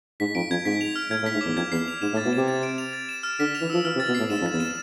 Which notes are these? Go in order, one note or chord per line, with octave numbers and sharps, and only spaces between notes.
G#2 B6
F2 D7
F2 G#6
G#2 B6
F7
F6
A2 G#6
A2
B6
G#2
E2 D6
F2 G#6
E2 C7
F7
G#2 E7
A2
A6
B2
C3 E7
A6
D7
F7
A6
E7
F6
D3 B6
F7
E3
F3 E6
E3 F6
C3
A6
B2
A2 C7
G#2 E7
F2
A6
E2
E7